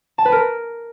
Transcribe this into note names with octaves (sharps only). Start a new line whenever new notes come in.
A5
B4
A#4